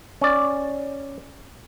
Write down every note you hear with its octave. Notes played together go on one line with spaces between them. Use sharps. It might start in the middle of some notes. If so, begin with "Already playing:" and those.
C#4 D5